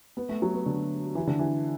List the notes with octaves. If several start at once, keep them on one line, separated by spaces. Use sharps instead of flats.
B3
A3
F#3
B3
D3
E3
D3
E3